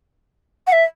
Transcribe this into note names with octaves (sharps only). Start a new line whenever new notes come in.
F#5
E5